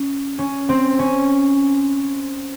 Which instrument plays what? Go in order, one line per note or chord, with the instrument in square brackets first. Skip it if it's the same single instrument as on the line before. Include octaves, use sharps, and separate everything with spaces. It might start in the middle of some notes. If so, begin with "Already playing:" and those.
Already playing: [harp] C#4
C#4
C4
C#4